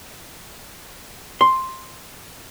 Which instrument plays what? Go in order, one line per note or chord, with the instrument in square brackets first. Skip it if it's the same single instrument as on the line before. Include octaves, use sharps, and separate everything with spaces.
[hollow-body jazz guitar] C6